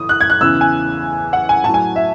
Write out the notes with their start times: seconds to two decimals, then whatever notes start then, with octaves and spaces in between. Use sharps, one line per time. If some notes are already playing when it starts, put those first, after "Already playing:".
Already playing: A2 E3 D#6
0.09 F#6
0.21 G#6
0.30 F#6
0.41 E2 C#3 E3 E6
0.61 G#5
1.33 F#5
1.49 G#5
1.64 A2 F#3 A5
1.74 G#5
1.96 E5